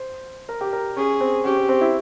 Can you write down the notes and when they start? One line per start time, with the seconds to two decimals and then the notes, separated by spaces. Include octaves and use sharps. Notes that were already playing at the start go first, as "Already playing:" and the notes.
Already playing: C5
0.49 A#4
0.61 G4
0.73 A#4
0.97 C#4 G#4
1.21 C4
1.44 C#4 G4
1.57 C#4
1.69 C4
1.81 E4